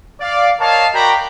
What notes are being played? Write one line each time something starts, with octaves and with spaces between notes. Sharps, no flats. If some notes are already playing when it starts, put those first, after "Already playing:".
D5 F5
A#4 C#5 D#5 F5 A5
F#4 A#4 D5 G5 A#5 B5